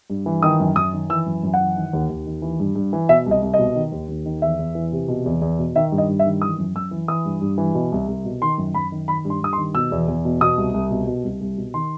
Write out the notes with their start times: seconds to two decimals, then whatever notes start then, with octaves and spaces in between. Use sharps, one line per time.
0.10 G2
0.26 E3
0.42 D#3 D#6
0.60 F#2
0.76 F#2 D#6
0.93 D#3
1.10 E3 E6
1.26 F#2
1.43 F#2
1.54 F#5
1.60 E3
1.76 D#3
1.93 D#2
2.10 D#2
2.27 D#3
2.42 E3
2.60 G2
2.76 G2
2.93 E3
3.09 B2 E5
3.26 C2
3.31 D#5
3.42 C2
3.54 D#5
3.59 B2
3.75 D#3
3.92 D#2
4.09 D#2
4.26 D#3
4.42 E2 E5
4.59 E2
4.75 E3
4.92 C3
5.08 B2
5.26 E2
5.42 E2
5.59 B2
5.75 D#3 E5
5.92 G2
5.98 D#5
6.08 G2
6.19 E5
6.25 D#3
6.42 E3 D#6
6.58 F#2
6.75 F#2 E6
6.91 E3
7.08 E3 D#6
7.25 G2
7.41 G2
7.58 E3
7.75 B2
7.92 C2
8.08 C2
8.25 B2
8.42 D#3 C6
8.58 F#2
8.74 F#2 B5
8.92 D#3
9.08 D#3 B5
9.25 G2
9.30 C6
9.41 G2 D#6
9.53 C6
9.58 D#3
9.75 B2 E6
9.92 E2
10.08 E2
10.25 B2
10.41 B2 D#6
10.58 C2
10.74 C2
10.91 B2
11.07 B2
11.24 C2
11.41 C2
11.57 B2
11.74 D#3 C6